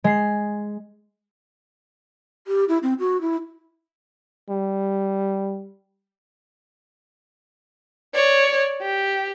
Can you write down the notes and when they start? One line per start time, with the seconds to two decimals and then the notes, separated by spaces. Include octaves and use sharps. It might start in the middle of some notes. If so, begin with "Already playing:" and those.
0.04 G#3 C7
2.47 G4
2.68 E4
2.83 C4
2.99 F#4
3.21 E4
4.49 G3
8.15 C#5 D5
8.82 G4